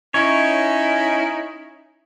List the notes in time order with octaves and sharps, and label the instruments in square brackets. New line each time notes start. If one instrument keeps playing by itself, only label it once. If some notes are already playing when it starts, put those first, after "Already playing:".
[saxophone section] C#4 D#4 E4 [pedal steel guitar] C#5